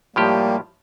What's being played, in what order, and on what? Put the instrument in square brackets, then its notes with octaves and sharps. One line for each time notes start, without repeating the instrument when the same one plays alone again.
[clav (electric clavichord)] A2 F3 G4 [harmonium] G3 A#3